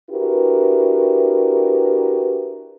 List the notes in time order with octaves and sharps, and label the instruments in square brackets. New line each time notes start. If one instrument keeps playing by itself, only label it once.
[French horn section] D4 E4 F#4 G4 A#4 B4